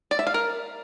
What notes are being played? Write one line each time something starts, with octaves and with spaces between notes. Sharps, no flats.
D5
E5
F5
A#4